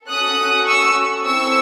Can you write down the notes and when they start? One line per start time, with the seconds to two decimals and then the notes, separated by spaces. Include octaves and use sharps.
0.08 C#4 F#4 A4 D#6 F#6
0.67 C#6 E6
1.25 C4 E4 A4 C#6 E6